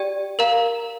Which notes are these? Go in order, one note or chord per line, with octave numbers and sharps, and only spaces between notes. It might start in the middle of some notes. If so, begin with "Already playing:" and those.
Already playing: G4 D5 G5
A#4 F5 A#5